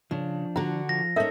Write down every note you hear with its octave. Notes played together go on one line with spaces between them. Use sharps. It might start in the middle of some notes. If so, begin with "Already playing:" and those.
C#3 F3 D4
D3 F#4 A#5
F3 A#6
C#4 D#4 A4 A#4 E5